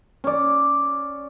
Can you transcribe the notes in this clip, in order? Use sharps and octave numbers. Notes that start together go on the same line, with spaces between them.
C#4 D5